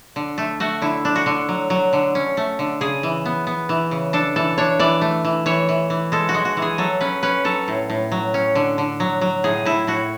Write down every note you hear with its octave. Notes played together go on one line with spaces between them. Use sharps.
D3
A3
A3 F#4
D3 E4
D4
F#4
D3
F#3
F#3
D3
C#4
A3
D3
C#3 G#4
E3
B3
B3
E3
C#3
D4 A4
E3 A4
D4 C#5
E3 D5
A3
E3
E3 C#5
E3
E3
G#3 A4
F#4
G#3
F#4
E3
G#4
F#3 A4
C#4 B4
C#4 B4
F#3 A4
A2
A2
F#3
C#4
D3
D3
F#3
F#3
A2 G#4
A2 E4
A2 F#4